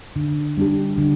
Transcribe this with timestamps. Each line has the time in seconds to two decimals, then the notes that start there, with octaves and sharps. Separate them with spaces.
0.16 D3
0.57 G3 D4 G4
0.98 D3